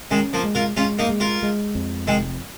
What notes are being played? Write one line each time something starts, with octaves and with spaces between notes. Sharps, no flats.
D#3 G#3 C#4
F3 A#3
G#3
F4 A#4
G#3 C#4 F4
A#3 D#4
G#3
F4 A#4
G#3
F2
F1 D#3 G#3